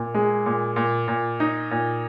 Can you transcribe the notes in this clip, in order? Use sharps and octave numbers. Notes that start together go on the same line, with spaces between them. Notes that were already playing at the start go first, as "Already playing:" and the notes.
Already playing: A#2
G#3
A#2
A#2
A#2
D#4
A#2